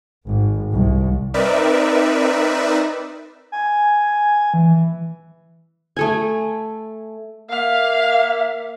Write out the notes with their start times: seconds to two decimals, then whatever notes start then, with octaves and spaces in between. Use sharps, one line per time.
0.25 G#1
0.72 C2
1.34 C4 D#4 A#4 B4 D5 E5
3.52 G#5
4.54 E3
5.97 A3 A4 G#5
7.50 A#3 E5 F5